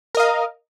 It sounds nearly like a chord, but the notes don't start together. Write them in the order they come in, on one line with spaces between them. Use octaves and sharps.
A#4 D#5 F5